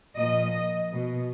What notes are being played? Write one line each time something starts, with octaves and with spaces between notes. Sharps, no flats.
A#2 F3 D#5
B2